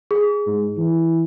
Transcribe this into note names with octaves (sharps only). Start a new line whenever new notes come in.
G#4
G#2
E3